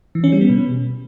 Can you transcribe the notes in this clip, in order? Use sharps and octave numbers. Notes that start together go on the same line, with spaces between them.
E3
C#4
G3
B3
B2